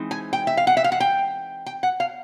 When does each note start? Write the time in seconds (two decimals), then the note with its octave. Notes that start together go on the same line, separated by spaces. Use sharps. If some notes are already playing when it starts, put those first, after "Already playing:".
Already playing: E3 G#3 C4 D#4
0.11 G#5
0.33 G5
0.47 E5
0.57 F5
0.67 F#5
0.77 E5
0.84 F5
0.92 F#5
1.00 G5
1.66 G5
1.83 F#5
2.00 F5